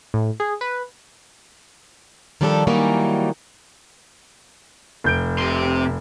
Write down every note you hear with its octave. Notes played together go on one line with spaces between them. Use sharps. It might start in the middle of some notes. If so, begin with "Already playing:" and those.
A2
G#4
B4
D#3 F3 G3 D4 E4 A4
D#3 E3 F#3 G3 A#3 D#4
F1 G6 D7
C3 C6